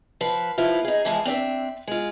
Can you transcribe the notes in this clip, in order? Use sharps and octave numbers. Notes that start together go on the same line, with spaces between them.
F3 B4
F3 B3 E4 F4
D#4 G#4
E3 F3 G#3
C4 D4 D5 E5
G#3 F4